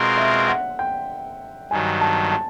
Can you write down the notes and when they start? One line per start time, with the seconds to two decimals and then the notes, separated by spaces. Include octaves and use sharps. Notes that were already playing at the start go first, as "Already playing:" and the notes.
Already playing: B2 G#3 C4 F4 A#4
0.18 E5
0.48 F#5
0.79 G5
1.71 G2 D#3 F#3 G#5
2.01 A5
2.32 A5